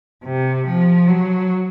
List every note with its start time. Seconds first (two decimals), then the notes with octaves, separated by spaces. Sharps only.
0.25 C3
0.67 F3
1.08 F#3